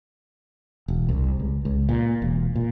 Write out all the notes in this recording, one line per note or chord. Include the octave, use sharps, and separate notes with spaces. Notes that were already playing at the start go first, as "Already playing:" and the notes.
E1
C2
C#2
C#2
A#2
E1
A#2